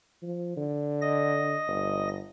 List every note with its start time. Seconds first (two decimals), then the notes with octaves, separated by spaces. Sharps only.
0.23 F3
0.57 D3
1.02 D#5 A#6
1.67 G1